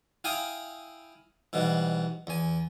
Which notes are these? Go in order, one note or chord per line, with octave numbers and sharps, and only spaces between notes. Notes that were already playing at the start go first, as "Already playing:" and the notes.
E4 F5 G5 G#5 D#6
G#2 B2 E3 G3
E2 G#5